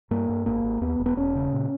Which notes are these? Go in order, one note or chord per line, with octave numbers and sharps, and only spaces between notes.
G2 A#3
G2
G#1 A#3
G#1
D#2 B3
E1
B3
E1 C#4
C#3
A#2